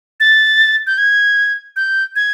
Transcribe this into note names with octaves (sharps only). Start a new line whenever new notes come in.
A6
G6
G#6
G6
G#6